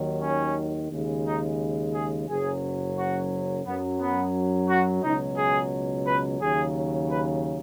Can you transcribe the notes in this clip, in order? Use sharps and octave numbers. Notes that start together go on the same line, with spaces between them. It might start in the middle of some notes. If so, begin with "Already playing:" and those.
Already playing: D#2 D#3 F#3
C#4
D#2 C#3 G#3
D#4
G#4
F#1 F#2 F#3 G#4
F#4
F#2 F#3 B3
B3
F#4
C#2 B2 F#3 D#4
G#4
B4
D#2 C#3 F#3 G#4
B4